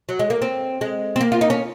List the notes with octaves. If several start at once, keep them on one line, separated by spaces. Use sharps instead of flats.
F#3
G#3
A#3
C4
G#3
C4
A#3
F4
D#4
C#4